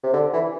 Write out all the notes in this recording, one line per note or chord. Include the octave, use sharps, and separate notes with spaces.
C3
D3
E3